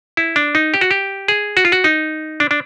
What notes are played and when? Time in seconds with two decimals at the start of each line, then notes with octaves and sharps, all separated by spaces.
0.17 E4
0.36 D4
0.55 D#4
0.74 G4
0.81 F#4
0.91 G4
1.28 G#4
1.57 F#4
1.65 F4
1.72 F#4
1.84 D#4
2.40 D4
2.51 D4